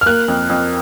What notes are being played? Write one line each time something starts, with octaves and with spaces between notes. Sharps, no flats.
F6
A#3 F#6
F2
F2